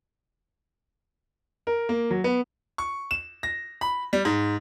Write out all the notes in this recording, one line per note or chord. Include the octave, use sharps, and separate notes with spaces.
A#4
A#3
F#3
B3
C#6
E7
A#6
B5
G3
G#2